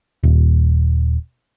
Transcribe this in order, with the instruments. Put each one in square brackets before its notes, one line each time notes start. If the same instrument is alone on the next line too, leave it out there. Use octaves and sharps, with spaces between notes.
[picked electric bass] D#1